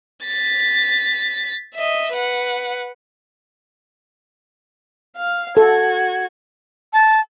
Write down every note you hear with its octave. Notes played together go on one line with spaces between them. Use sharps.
A6 B6
D#5 E5
B4 F#5
F5
F#4 A4 G#6
A5